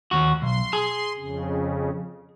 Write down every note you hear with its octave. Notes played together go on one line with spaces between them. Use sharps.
D#2 F#4
B1 C6
G#4
F2 C#3